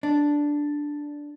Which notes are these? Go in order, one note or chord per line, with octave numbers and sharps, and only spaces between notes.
D4